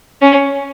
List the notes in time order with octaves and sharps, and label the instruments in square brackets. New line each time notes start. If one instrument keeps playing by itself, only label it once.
[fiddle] C#4